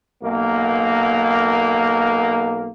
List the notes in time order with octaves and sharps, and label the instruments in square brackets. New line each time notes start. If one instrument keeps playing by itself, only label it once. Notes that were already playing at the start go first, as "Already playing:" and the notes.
[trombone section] B1 A#3